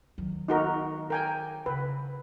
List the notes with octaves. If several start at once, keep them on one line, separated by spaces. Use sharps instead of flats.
D#3 F#3
D#4 F#4 A#4
A#4 G5 G#5
C#3 B4